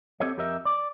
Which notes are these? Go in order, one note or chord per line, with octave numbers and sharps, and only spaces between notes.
C4 G4 A4 C#5 D#5
F2 G4 A#4 D#5 E5
D5